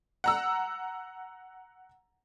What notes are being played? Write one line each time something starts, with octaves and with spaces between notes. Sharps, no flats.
F#5 A#5 E6